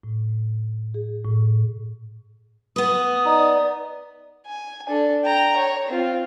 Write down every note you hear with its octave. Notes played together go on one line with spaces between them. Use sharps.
A2
G#4
A2
B3 B4 D#6
D#4 D5
G#5
D4 A4
G5 A#5
C#5
C4 F4